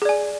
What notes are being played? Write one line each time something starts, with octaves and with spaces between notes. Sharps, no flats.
G#4 D5 G#5